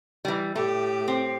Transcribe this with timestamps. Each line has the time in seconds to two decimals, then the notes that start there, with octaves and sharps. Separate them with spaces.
0.25 E3 G3
0.55 A2 A3 G4
1.08 C4